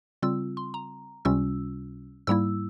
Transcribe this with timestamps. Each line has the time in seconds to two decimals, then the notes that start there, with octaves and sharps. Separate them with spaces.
0.22 C#3 G3 C4 F4 E6
0.57 C6
0.74 A#5
1.25 C#2 C3 G3 C#4 F4 E6
2.27 G#2 G3 A#3 E4 E6